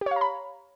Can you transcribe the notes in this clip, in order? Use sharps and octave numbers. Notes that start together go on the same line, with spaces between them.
G4 C#5 F5 A#5 B5